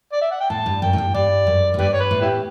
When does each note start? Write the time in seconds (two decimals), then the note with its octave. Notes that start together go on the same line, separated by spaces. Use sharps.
0.13 D5
0.22 E5
0.31 F#5
0.40 G5
0.50 A2 A5
0.66 G2
0.82 F#2 G5
0.93 A2
0.98 G2
1.14 G2 D5
1.47 F#2
1.74 A2
1.79 G2 G4 B4 D5
1.93 C#5
2.00 B4
2.11 A2
2.21 B3 E4 G4